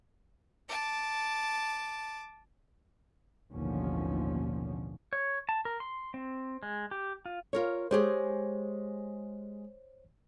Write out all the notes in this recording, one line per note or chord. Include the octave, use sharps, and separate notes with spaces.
A5 D6
A1 D#2 B2 D3 F3 C#4
C#5
A5
A#4
C6
C4
G#3
G4
F4
F4 A#4 C#5
G#3 G4 G#4 C5 C#5